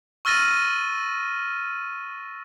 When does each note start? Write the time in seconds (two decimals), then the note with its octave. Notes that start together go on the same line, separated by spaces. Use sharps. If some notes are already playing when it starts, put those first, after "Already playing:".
0.25 C#6 E6 F6 A6 A#6 D#7